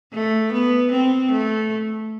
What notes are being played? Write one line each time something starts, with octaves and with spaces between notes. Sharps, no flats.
A3
B3
C4
A3